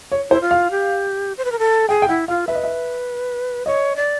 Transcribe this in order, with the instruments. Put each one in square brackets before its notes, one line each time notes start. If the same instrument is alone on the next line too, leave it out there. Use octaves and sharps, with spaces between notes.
[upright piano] C#5
[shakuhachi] E4 [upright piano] C5
[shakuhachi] F4
[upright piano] F5
[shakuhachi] G4
C5
B4
A#4
A4
[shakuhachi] G#4 [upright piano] G5
[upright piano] G5
[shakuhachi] E4 [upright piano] F#5
[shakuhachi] F4 [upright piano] F5
[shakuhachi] B4 [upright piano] E5
[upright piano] D#5
E5
[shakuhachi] C#5 [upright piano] D#5
[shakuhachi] D5